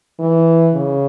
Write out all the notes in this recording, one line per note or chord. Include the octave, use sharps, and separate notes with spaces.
E3
C#3